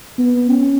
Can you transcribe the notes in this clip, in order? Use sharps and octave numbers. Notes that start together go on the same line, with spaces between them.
B3
C#4